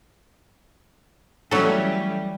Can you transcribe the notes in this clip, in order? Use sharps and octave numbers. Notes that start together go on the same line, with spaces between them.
E3 F#3 G3 A3 C#4 A4